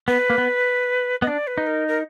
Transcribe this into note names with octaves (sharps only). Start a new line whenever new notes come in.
B3 B4
A#3
B3
B3 D#5
D4 D5
B4
D#4
A#4
A#4